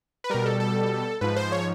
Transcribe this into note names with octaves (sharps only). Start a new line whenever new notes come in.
B4
B2 G3 A#4
A4
A4
G#2 F3 B4
C5
C#5